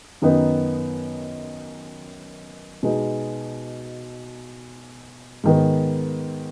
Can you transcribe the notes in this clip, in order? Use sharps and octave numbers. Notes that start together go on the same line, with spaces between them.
F#2 D#3 B3 D#4
B2 G#3 B3 D#4
G#2 D#3 B3